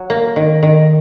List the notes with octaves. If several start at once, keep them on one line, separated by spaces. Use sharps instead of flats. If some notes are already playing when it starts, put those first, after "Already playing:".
Already playing: F#3
A#3
D#3
D#3